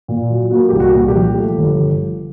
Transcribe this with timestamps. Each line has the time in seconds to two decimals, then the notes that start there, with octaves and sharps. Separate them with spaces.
0.08 A#2
0.30 F#3
0.51 A#3 F#4
0.69 C2 G4
0.80 F#4
0.94 A#2
1.08 G4
1.15 F3
1.36 A3
1.57 G1